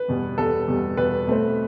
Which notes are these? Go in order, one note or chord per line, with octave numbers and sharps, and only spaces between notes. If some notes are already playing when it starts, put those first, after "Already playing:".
Already playing: B4
E2 B2 G3
E2 B2 G3 A4
E2 B2 G3
E2 B2 G3 B4
B2 A3 C4